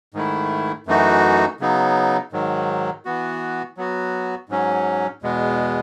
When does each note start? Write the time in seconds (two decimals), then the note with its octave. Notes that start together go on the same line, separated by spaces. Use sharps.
0.14 G#2 D#3 A3 E4
0.87 F#2 E3 A3 D#4 F#4
1.60 C#3 F#3 B3 D#4
2.32 G#2 D#3 F#3
3.05 E3 B3 F#4
3.77 F#3 B3 F#4
4.49 G#2 F#3 C#4
5.22 E2 B2 G#3 B3